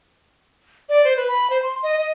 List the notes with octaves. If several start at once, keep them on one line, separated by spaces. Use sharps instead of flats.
D5
C5
B4
B5
C5
C6
D#5
D#5